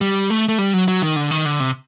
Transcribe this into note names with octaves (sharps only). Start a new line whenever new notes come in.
G3
A3
A3
G3
F#3
F#3
D#3
D3
D#3
D3
C3